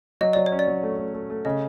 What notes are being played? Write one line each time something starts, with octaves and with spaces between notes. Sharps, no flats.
F#3 D#5
F#3 D5
C#5
C#4
D5
F#3
A3
A3
A3
A3
C#3 D#5